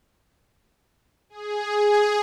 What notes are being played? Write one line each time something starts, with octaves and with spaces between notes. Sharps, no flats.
G#4